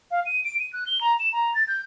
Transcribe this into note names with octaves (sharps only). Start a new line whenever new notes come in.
F5
D#7
D7
D#7
F#6
G7
A#5
E7
A#5
A6
G6